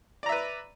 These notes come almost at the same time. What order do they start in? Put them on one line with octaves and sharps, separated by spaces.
D5 A#5 E5 B4